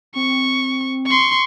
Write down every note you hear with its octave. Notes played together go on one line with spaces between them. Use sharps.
C4 C#6
C6 C#6